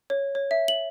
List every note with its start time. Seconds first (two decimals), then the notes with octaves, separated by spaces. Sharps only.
0.10 C#5
0.35 C#5
0.51 E5
0.68 F#7